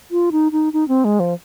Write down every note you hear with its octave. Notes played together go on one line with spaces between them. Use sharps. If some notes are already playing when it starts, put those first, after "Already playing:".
F4
D#4
D#4
D#4
C4
G#3
F3